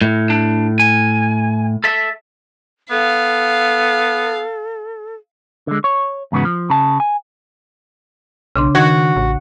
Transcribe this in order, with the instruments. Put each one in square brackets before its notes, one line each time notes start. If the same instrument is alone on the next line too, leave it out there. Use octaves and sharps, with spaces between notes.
[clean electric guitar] A2
[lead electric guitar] D4
G#5
A4 E5
[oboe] B3 [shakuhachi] A4 [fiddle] F5
[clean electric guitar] D3 G#3
C#5
E2 G#2 C#3 B3 F#4
F3
C#3 A5
G#5
[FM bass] B1 [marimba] C#3 D4 C6
[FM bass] D#3 [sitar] F#4 [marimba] G#6
[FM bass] A1